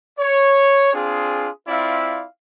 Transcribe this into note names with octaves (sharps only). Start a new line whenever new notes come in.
C#5
C4 D4 F4 G#4
C4 E4 F4 D5 E5 F5